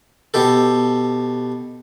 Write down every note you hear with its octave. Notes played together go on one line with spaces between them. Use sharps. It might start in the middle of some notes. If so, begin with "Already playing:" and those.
B2 G4 A4